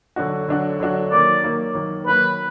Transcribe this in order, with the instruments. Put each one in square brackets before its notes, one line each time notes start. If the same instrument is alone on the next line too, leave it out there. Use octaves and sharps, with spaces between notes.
[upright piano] D3 F#3 D4 F#4
D3 F#3 D4 F#4
D3 F#3 D4 F#4
[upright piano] D#3 F#3 A#3 [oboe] D5
[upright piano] D#3 F#3 A#3
D#3 F#3 A#3
[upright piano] D#3 F#3 A#3 [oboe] B4